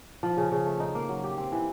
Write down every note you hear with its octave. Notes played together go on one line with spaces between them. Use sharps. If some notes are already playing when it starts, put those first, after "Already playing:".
F3
C#3
C#3
A3
D#4
A#3
F#3
G4
C4
E3